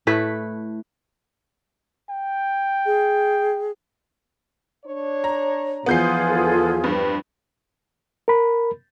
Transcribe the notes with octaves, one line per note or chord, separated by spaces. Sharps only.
A2 A3 E4 B4
G5
G#4
D4 C#5
A#5
E2 F3 B3 F4 G#4 G6 C7
D3 A4
G2 G3 C4 B4
A#4 B5